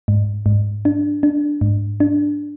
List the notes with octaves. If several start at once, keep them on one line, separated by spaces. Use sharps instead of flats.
G#2
G#2
D4
D4
G#2
D4